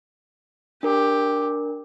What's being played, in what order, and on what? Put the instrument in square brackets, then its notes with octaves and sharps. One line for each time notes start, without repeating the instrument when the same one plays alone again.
[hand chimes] D4 A#4 [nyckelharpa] G4